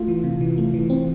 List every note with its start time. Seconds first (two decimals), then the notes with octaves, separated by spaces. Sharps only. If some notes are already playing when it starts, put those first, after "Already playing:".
Already playing: A3 F4
0.08 E3
0.24 C3
0.41 E3
0.58 A3
0.74 E3
0.90 C4